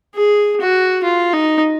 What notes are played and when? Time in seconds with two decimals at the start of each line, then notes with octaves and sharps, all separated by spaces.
0.16 G#4
0.61 F#4
1.04 F4
1.33 D#4